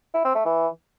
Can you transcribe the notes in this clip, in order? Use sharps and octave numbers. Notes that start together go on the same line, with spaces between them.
E4
C4
A3
E3